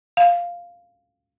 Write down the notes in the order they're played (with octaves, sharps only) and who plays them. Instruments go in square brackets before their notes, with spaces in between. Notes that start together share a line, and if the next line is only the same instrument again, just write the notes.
[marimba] F5